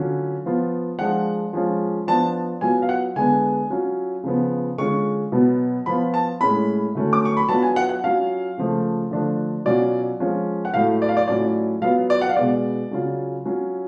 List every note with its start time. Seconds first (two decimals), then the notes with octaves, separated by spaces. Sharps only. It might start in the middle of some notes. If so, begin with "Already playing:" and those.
Already playing: D3 F#3 C#4 F4
0.46 F3 B3 F4
0.99 F3 G#3 D4 F4 F#5
1.53 F3 G#3 C#4 F4
2.07 F3 B3 D4 A5
2.61 F#3 B3 F4 G#5
2.82 F5
2.89 F#5
3.16 D3 G#3 B3 D4 G#5
3.70 F#3 C#4 F4
4.24 C#3 F3 B3
4.78 D3 G#3 C#4 F4 C#6
5.32 B2 F#3 B3
5.86 F3 B3 F4 B5
6.14 A5
6.41 A2 G#3 C#4 B5
6.95 D3 F#3 A3 C#4
7.13 D6
7.25 C#6
7.37 B5
7.49 F#3 B3 D4 F4 A5
7.63 G#5
7.76 F#5
7.89 F#5
8.04 F#3 C#4 F4 F5
8.58 C#3 F3 A3
9.11 D3 F3 A3 D4 F4
9.65 B2 F#3 C#4 F4 D5
10.20 F3 G#3 C#4 F4
10.65 F#5
10.74 A2 F#3 A3 F5
11.02 D5
11.09 F5
11.17 D5
11.28 A2 F#3 C#4 F4 D5
11.82 F#3 B3 F4 F5
12.10 D5
12.21 F#5
12.29 F5
12.36 B2 G#3 B3 D5
12.91 C#3 F#3 C#4 F4
13.45 F#3 C#4 F4